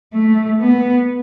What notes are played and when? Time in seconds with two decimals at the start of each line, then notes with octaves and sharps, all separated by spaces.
0.13 A3
0.60 B3